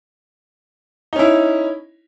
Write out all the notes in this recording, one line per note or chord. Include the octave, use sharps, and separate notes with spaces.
C#4 D#4 E4